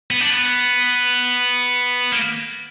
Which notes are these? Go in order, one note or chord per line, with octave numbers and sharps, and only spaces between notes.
B3
D4
B3
A#3